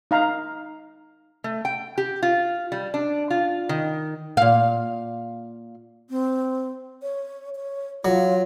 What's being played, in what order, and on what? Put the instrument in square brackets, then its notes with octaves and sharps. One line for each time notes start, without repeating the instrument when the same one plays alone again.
[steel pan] D#4 F5 A#5
[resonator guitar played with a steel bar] A3
G5
G4
F4
G3
D4
F4
D#3
[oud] A#2 F5
[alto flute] C4
C#5
C#5
[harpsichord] F#3 [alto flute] F4